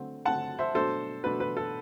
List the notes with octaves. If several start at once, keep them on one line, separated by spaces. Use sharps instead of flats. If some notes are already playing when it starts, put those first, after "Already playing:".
Already playing: D3 F#3 A3 C4
D3 F#3 A3 C4 F#5 A5
C5 E5
B2 F#3 A3 D4 A4 C5
B2 F#3 A3 D4 B4
B4
A4